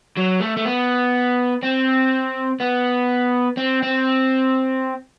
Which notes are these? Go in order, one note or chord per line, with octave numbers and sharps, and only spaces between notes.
F#3
A3
A3
B3
C4
B3
C4
C4